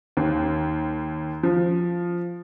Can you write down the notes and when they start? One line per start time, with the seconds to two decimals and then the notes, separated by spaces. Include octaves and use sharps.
0.17 D#2
1.43 F3